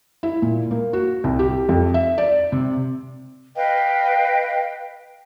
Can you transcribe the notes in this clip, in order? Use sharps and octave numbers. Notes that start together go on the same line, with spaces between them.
E4
A#2
A#3
F#4
C2
G4
F2
E5
D5
C3
B4 D#5 F5 G5